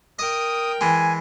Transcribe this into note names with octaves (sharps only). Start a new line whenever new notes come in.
A#4 D#5 G5 D#6
E3 G#3 G#5